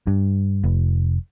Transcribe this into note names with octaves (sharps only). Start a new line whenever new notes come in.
G2
F1